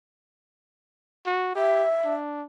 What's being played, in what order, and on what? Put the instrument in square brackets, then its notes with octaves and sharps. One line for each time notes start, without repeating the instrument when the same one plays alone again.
[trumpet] F#4
[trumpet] G4 [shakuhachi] E5
[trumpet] D4